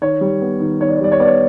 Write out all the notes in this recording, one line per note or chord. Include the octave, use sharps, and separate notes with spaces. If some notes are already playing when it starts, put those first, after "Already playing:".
D#3 C#5
G3
B3
D#3
D#3 C#5
D5
C#5
G3 D5
C#5
B3 D5
C#5